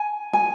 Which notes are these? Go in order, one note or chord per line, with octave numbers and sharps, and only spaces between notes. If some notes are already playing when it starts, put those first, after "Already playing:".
Already playing: G#5
G#5